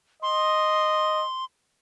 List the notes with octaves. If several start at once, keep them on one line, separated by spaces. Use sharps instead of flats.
D#5 C6